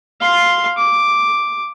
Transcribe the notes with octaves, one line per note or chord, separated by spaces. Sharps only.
F5 C6
D6